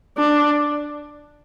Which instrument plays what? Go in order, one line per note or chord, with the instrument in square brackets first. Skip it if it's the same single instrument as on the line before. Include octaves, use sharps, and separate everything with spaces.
[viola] D4